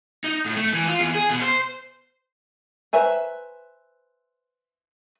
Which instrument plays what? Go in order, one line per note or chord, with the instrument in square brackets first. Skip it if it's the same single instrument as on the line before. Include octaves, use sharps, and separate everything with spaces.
[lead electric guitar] D#4
A2
A3
E3
F4
E2
G#4
B2
C5
[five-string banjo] B4 C5 E5 G#5 A#5